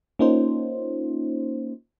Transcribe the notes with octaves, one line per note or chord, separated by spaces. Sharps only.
A#3 C#4 D#4 F4 C5